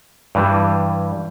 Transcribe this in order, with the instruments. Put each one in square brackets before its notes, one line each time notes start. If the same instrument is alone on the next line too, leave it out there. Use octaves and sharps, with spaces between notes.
[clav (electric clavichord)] G2 E3 G3